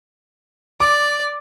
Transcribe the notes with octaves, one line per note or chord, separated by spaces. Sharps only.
D5 D6